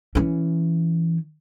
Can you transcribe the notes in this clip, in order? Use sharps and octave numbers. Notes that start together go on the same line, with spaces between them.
E3 C#4